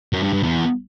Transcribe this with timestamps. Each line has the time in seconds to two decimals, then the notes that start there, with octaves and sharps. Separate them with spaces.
0.13 F#2
0.23 G2
0.33 G2
0.43 E2